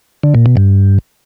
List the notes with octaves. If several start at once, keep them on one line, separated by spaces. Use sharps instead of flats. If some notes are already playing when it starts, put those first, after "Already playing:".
D3
A#2
B2
G2